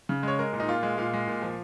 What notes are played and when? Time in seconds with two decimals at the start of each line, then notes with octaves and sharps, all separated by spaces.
0.09 C#3
0.23 G#3 C#5
0.39 G#3 A#4
0.53 A#2
0.60 D#4
0.68 A#2 F4
0.83 G#3
0.98 A#2 F5
1.13 G#3
1.27 A#2
1.42 F3